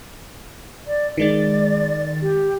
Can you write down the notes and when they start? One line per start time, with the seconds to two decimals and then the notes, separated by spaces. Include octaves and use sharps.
0.87 D5
1.18 D#3 G#3 D5 A6
2.22 G4